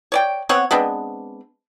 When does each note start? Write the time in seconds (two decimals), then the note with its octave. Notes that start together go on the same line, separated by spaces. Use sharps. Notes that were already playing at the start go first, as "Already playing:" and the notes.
0.12 C#5 D5 G5
0.49 B3 C4 C#5 F#5
0.71 G#3 B3 C4 D4